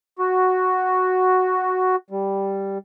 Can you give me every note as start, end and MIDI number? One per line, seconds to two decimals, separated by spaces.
0.19 1.96 66
2.10 2.78 55